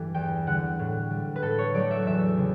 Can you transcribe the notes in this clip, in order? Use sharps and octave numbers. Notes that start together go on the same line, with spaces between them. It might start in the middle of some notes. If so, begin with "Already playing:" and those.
Already playing: G2 E3 G3 A3
E2 G5
D3 G3 F#5
A2
G3
B4
A2 A4
C#5
F#3 A3 D5
E5
E2 E5
C#3 G3